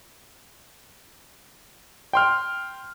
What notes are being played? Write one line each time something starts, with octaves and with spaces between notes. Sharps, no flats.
G5 C6 F6